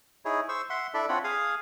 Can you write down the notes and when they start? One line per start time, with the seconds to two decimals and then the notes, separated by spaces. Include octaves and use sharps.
0.25 D#4 E4 G#4 C#5
0.49 C5 C#6 E6
0.70 E5 F#5 C6
0.94 D4 E4 A4 D5 E5
1.09 C4 D4 F4 C#5 F#5 B5
1.24 G#4 F5 G#5 D#6